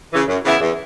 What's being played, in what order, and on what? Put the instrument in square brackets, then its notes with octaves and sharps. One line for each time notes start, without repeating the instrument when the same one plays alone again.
[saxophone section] C#3 E3
F#2
C#3 E3 B3 E4
E2